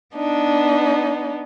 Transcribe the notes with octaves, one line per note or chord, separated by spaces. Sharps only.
B3 D4 D#4